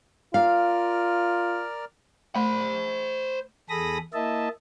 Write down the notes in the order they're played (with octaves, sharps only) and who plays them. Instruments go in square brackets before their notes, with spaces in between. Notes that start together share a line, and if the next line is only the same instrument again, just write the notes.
[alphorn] F4 [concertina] A#4 D5 F6 [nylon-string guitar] F5
[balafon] A3 [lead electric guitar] C5 B5
[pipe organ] E2 G#4 A4 B5 D#6 A#6
A#3 E4 D#5 E5 A5